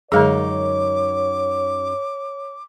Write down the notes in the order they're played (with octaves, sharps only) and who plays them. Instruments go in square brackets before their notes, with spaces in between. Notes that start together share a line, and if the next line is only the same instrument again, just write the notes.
[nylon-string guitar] F#2 D#4 A#4 [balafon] D3 G#3 G#4 [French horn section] C#5 [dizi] D6